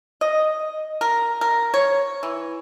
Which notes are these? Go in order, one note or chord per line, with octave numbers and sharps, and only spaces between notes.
D#5
A#4
A#4
C#5
E3